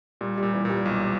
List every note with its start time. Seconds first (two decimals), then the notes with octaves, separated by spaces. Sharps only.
0.21 A#2 G3
0.38 A#2 G3
0.54 E3
0.65 A#2 G3
0.85 B1